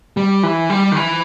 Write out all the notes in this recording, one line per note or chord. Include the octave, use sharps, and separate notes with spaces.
G3
E3
G3
D#3
E3